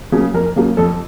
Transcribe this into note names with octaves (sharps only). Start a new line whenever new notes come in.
C#3 F#3 A#3
F2 A#4
C#3 F#3 A#3
F2 A4